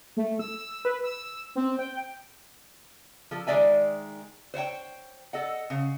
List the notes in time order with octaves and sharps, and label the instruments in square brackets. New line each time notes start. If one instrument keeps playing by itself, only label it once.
[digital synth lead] A3
E6
B4
E6
C4
G5
[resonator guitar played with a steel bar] F3 A4
D#3 G#3 D5 E5 G#5
C5 C#5 F#5 G5
A4 D#5 F#5
C#3